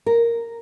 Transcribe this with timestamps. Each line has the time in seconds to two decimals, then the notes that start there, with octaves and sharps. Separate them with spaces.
0.06 A#4